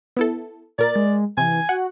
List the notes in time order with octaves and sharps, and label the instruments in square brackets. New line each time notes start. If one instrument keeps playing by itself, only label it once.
[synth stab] B3 E4 A4
[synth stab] A#2 A#4 [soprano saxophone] D5 [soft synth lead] A6
[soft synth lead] G#3
[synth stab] C3 [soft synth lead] E3 [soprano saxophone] G#5
[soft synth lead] F#4 [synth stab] F#5